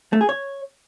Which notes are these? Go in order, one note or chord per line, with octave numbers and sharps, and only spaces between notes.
A3
G#4
C#5